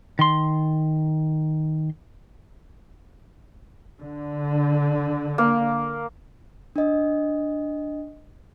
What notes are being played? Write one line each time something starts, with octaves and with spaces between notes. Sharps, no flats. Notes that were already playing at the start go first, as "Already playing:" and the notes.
D#3 C6
D3
A#3
D4 D#5